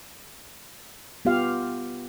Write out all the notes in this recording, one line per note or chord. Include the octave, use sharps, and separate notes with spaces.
B3 F4 G4 F5